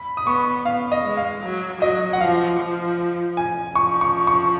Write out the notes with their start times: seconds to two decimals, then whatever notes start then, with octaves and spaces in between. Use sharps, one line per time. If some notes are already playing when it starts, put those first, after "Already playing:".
Already playing: B5
0.17 D#6
0.27 B3 C#6
0.65 B3 F5
0.92 D#5
1.04 G#3
1.17 F5
1.43 F#3
1.82 F#3 D#5
2.13 F#5
2.21 F3 F5
2.60 F3
3.37 G#5
3.75 F3 C#6
4.01 C#6
4.27 C#6